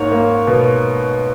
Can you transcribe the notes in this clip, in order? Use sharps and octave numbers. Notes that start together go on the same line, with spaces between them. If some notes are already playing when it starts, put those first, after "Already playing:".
Already playing: G#2 A#3 A#4 C#5
A#3
B2